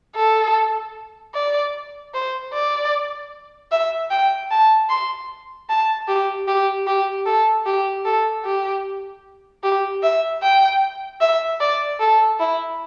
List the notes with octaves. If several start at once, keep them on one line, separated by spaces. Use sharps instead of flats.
A4
D5
C5
D5
E5
G5
A5
C6
A5
G4
G4
G4
A4
G4
A4
G4
G4
E5
G5
E5
D5
A4
E4